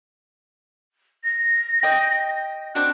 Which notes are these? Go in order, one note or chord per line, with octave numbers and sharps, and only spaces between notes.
A#6
D#5 G5
C4 D4 F#4 F#6